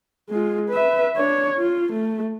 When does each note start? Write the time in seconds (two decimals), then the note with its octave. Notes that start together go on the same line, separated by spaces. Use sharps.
0.30 G#3 F4
0.70 B4 E5
1.17 D4 C#5
1.59 F4
1.92 A3